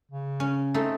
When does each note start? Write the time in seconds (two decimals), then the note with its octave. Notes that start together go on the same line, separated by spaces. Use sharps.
0.12 C#3
0.40 C#4
0.74 A3 C4 D#4